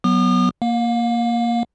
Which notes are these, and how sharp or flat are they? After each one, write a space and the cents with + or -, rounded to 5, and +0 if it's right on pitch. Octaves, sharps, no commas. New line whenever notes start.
F#3 +0 B3 +0 D#6 -40
A#3 +0 F5 +35